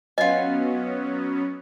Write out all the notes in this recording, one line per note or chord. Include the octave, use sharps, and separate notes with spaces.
F#3 B3 C#4 F4 D#5 G#5